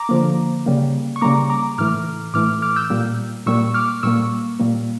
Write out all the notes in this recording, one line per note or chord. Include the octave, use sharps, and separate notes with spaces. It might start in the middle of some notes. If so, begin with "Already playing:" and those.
Already playing: A#5 D6
D3 F3 A#3
C#3 G3 A#3
C#6
C#3 G3 A#3 A#5 D6
A#5 D6
A2 E3 A3 D6 F6
A2 E3 A3 D6 F6
D6 F6
E6 G6
A#2 G3 A#3
A#2 G3 A#3 C#6 E6
D6 F6
A#2 G3 A#3 C#6 E6
A#2 G3 A#3